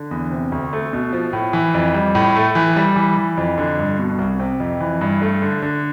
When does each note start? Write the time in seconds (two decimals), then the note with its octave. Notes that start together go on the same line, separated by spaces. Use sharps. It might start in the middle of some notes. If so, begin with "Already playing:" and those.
Already playing: D3
0.11 E2
0.31 C3
0.52 D2
0.73 A3
0.93 B2
1.12 F3
1.33 A2
1.53 E3
1.74 F2
1.94 G3
2.15 A2
2.36 A3
2.55 E3
2.76 G3
2.96 E3
3.17 E3
3.37 F2
3.58 D3
3.79 G2
3.99 B2
4.18 C2
4.40 C3
4.60 F2
4.80 E3
5.01 G2
5.22 A3
5.42 D3
5.62 D3